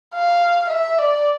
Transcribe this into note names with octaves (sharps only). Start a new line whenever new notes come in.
F5
E5
D5